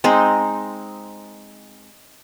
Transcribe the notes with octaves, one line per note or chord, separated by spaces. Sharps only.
G#3 C4 D#4